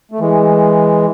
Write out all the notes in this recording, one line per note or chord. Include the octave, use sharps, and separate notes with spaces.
A3
E3 G#3